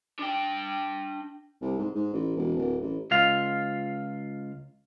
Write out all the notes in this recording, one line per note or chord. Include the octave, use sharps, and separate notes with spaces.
D4 G5
C2
G#2
G#2
A1
E1
D1
A1
C#2 F4 F5